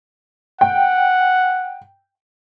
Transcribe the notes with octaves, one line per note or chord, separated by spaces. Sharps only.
F#5 G5